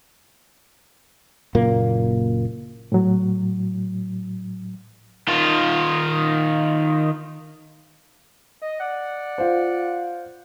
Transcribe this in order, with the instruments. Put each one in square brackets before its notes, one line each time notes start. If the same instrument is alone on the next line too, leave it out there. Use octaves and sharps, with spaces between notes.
[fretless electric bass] F#1 A#2 A#3
[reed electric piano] A2 F#3
[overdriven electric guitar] D#3 F4
[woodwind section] D#5
D5 F#5
[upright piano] F4 C5